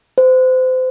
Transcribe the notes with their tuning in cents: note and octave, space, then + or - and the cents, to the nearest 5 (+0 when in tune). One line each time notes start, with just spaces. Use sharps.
C5 -30